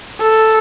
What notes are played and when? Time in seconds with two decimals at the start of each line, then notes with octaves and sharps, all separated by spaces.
0.21 A4